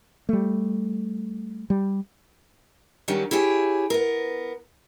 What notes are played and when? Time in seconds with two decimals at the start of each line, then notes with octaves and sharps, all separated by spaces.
0.29 G3 A3
1.70 G3
3.08 D#3 F#3 G3 C#4
3.31 E4 G4 G#4 C#5
3.90 B3 A#4